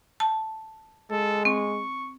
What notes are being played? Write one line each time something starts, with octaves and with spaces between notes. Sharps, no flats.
A5
G#3 A4
C4 C#6